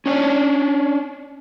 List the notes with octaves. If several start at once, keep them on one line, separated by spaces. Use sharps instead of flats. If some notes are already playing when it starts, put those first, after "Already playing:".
C#4 D4 C#5